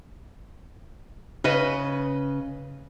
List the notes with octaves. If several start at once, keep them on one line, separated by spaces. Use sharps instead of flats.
C#3 B4 D#5